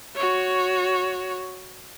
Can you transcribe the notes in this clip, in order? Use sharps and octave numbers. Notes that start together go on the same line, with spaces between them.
F#4 C#5